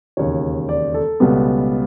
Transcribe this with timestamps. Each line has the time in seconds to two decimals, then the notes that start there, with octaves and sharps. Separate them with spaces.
0.17 E1 D#2 C#3 C#5
0.69 D5
0.94 A4
1.20 C#2 B2 G3 B3